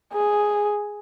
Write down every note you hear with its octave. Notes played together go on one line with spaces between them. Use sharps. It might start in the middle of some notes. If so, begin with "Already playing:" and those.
G#4